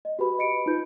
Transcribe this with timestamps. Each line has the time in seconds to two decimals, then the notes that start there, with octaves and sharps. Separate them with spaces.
0.05 D#5
0.19 F#4 G4 B4 B5
0.38 D#5 B5 C#7 D7
0.66 D#4 F4 B4 G6